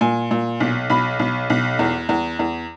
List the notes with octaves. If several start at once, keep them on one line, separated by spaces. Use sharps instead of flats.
A#2 G#5
A#2
B1
B1 B5
B1
B1
E2
E2
E2